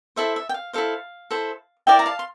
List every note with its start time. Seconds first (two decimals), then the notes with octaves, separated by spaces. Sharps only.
0.16 E4 A4 C5 E5
0.36 E5
0.49 G5
0.54 F5
0.73 E4 A4 C5 F5
1.31 E4 A4 C5
1.87 E4 A#4 D5 E5 G5
1.99 A#5
2.06 F5 A5
2.19 C6